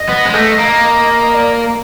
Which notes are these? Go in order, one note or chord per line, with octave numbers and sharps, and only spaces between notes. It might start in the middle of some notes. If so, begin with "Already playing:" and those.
Already playing: D#5
B3
G#3
A3
A#3
D5